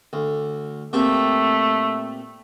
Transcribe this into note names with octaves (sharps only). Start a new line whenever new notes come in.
D2
A#2 A3 C4 G4